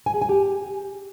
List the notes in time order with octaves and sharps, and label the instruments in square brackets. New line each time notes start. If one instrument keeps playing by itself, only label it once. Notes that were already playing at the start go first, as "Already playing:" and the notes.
[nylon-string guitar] G#5
G#4
G#5
G4